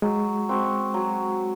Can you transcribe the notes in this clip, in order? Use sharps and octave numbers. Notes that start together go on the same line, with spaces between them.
F#3 G#3
C4 F#4
F#3